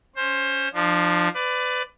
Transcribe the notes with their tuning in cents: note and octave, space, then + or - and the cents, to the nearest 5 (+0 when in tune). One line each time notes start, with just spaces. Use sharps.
C#4 +0 C5 +15
F3 +0 D4 +40
B4 +25 D5 +0